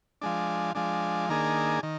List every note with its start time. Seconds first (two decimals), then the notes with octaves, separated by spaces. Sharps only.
0.21 F3 G#3 D4
0.75 F3 G#3 D4
1.29 D#3 A#3 D4 G#4
1.83 D#3